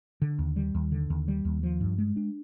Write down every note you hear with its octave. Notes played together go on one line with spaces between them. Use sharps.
D3
D#2
G3
D#2
D3
D#2
G3
D#2
F3
G2
G#3
D4